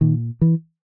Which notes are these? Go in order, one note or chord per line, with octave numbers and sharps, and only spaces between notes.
A#2 D#3
E3